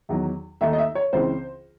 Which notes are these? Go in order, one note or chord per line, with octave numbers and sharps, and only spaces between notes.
E2 D#3 F#3
D#2 D#3 A3 D#4 E5
D#5
E5
C#5
C#2 C#3 E3 C4 C5